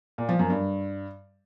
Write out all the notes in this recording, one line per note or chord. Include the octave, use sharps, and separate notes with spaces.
A#2
F3
F#2
G2